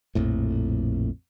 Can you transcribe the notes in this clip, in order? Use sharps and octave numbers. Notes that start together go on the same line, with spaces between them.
A#1 F2 A2